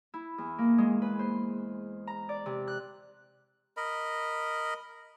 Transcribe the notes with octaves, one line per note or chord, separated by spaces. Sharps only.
E4
E2
A#3
G#3
B4
C5
A#5
D5
C3
F#6
A#4 D#5 B5